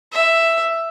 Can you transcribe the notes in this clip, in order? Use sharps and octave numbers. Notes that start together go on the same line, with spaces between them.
E5